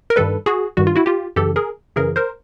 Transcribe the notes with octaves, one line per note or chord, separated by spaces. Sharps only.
A#4
G2 D#3 G3 A4 B4
F#4 G#4
G2 D#3 G3 F#4
F4
E4 F#4
F4 G4
F#2 C#3 E3 G4 A4
G#4 A#4
F#2 C#3 E3 G#4 A#4
A#4 C5